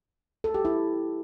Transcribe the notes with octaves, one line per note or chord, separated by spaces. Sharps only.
A4
G4
E4